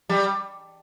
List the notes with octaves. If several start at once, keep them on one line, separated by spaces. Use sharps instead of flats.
G3